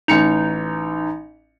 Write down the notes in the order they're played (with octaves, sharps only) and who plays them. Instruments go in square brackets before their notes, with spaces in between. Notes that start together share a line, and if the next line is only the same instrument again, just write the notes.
[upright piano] A1 C#7 F7 [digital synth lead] D#4